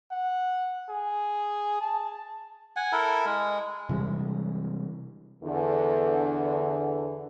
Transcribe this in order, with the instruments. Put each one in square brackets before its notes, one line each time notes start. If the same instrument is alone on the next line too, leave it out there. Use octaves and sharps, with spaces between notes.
[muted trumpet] F#5
G#4
A5
[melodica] F#5 G#5
E4 A4 A#4
G#3
[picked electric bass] C3 E3 G3 G#3
[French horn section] E2 D3